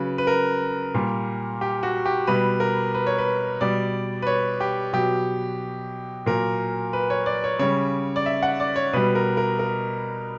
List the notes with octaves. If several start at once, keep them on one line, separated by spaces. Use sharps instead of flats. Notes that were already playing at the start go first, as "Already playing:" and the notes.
Already playing: C#3 F#3 B4
B4
A#4
A#2 G3
G4
F#4
G4
B2 G3 B4
A#4
B4
C#5
B4
B2 G3 D5
B4
C#5
G4
B2 F#3 G4
A#2 F#3 A#4
B4
C#5
D5
C#5
C#3 G3 C#5
D5
E5
F#5
D5
C#5
B2 G3 B4
A#4
A#4
A#4